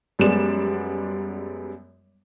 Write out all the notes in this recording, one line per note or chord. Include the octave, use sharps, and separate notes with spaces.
F#2 G3 G#3 B3 D5 E7